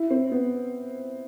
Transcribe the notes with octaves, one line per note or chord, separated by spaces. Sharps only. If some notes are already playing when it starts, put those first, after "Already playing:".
Already playing: E4
C4
B3